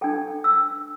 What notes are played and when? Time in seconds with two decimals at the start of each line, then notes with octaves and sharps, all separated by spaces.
0.01 D4 A4 G5
0.44 E6